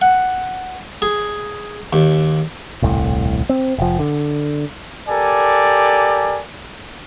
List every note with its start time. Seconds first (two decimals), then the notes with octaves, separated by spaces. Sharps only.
0.02 F#5
1.02 G#4
1.93 D#2
2.82 D#1 C2 A2
3.49 C4
3.78 F1 F3
4.00 D3
5.09 G4 A4 A#4 D5 G#5